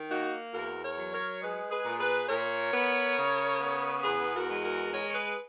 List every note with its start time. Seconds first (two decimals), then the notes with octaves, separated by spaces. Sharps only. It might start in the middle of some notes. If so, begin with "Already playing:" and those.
Already playing: D#3
0.10 A#3 D#4 F#4
0.53 E2 F#4 A#4
0.83 A#4 C#5
0.98 F#3
1.12 A#4 C#5
1.41 G#3 G#4 B4
1.71 G#4 B4
1.86 A#2
2.00 G#4 B4
2.29 A#2 A#4 C#5
2.73 B3
3.16 C#3
3.61 B3
4.04 E2 G#4 B4
4.34 F#4 A#4
4.49 G#3
4.63 F#4 A#4
4.92 G#3 A#4 C#5
5.10 C#5
5.14 G#4 B4